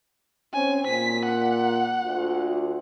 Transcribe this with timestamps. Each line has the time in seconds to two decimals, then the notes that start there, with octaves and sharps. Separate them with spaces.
0.53 C4 C#4 G#5
0.87 A#2 B6
1.26 F#5
2.04 D2 F4